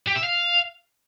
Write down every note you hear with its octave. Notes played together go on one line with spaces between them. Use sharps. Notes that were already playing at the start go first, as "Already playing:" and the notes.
G4
E5
F5